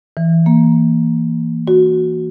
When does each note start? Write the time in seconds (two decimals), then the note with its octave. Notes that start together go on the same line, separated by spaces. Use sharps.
0.17 E3
0.46 A#3
1.67 F#4